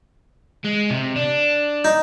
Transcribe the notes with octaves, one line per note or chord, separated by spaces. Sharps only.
G#3
C3
D4
D#4